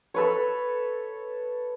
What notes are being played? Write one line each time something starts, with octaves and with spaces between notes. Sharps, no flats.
A4 B4 C#5